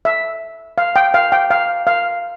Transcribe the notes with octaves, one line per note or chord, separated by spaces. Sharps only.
E5
F5
G5
F5
G5
F5
F5